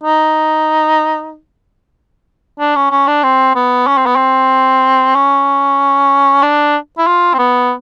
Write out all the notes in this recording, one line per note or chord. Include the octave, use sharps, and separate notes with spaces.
D#4
D4
C#4
C#4
D4
C4
B3
C#4
C4
B3
C4
C#4
D4
E4
F4
C4
B3